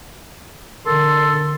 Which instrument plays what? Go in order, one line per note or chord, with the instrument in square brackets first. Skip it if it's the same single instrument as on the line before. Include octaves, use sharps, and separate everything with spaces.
[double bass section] D3 [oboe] A4 [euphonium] A#4 [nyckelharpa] C6